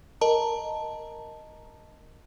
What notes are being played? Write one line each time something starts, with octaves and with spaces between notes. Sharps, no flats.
A#4 D#5 A5 A#5